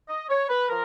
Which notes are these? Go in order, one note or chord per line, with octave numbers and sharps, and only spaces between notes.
D#5
C#5
B4
F3 A#4